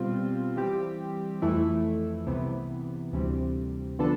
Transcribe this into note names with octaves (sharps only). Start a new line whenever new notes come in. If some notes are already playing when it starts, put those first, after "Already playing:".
Already playing: B2 G3 C4 F4
E3 G3 C4 G4
F2 E3 A3 E4
C2 C3 E3 B3
D2 C3 E3 G3 C4
D3 F3 B3 D4 A4